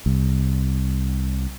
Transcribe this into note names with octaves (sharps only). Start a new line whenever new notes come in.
C2